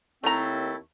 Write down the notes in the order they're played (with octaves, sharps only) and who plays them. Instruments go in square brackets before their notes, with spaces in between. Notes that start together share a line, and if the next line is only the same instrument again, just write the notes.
[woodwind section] D#2 C4 E4 [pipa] A3 A#5